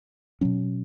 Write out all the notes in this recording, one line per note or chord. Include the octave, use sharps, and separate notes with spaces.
B2 F#3 C#4